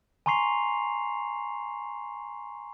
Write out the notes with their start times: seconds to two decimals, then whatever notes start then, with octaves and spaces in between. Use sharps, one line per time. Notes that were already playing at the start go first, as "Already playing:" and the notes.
0.26 G#5 A#5 C6 C#6 C7 F7